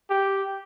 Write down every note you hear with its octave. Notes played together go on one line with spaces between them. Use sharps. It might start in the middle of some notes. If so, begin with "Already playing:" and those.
G4